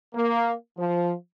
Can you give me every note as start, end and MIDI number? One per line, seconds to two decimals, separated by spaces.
0.15 0.53 58
0.78 1.12 53